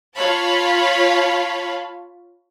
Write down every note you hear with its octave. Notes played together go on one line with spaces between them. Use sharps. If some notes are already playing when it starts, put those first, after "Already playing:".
F4 C#5 F5 A5 B5